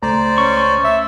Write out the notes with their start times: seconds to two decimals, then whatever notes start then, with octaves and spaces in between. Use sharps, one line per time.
0.03 C#2 A3 C5 D5 A#5
0.38 C#4 C#6
0.84 E5